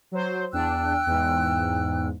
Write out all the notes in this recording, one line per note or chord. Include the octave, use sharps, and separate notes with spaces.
F#3 C5
E2 D4 G5 E6 F#6
E2 G#2